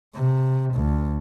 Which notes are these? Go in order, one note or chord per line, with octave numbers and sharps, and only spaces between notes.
C3
D2